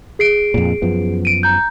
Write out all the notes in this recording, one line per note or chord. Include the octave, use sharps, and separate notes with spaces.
G#4 C7 D7
F2 A#2
F#2 F3 B3
D7 D#7
A#5 G6